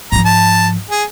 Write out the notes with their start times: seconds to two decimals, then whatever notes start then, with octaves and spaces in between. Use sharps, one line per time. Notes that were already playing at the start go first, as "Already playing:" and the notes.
0.12 G#2 F3 A#5
0.26 A5
0.91 G#4